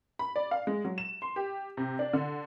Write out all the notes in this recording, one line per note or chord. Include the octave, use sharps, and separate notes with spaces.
B5
D5
F5
G#3
F#3
E7
C6
G4
C3
D4
D3